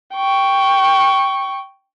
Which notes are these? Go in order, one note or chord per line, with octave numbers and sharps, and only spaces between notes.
G5 C#6